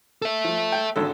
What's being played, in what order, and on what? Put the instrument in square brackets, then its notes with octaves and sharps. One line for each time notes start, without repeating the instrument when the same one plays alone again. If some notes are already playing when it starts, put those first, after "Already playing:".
[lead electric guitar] A4 E5
[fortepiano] F3
G5
G#1 D3 A4